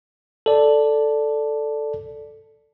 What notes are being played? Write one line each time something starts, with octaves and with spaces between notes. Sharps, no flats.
A4 D5